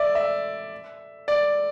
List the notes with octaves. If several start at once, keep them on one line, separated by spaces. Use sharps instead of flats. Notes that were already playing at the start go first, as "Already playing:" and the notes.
Already playing: D5 E5
E5
D5